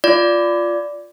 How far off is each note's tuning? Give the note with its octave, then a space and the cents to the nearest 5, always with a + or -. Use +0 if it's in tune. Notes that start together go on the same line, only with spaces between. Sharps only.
F4 +0 D5 -5